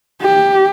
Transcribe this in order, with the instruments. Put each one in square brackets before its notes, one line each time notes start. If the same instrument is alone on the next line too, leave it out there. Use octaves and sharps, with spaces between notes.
[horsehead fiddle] G4